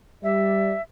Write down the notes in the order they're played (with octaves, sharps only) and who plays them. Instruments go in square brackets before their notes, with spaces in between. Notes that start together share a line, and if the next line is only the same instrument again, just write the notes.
[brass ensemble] G3 D5 [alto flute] E5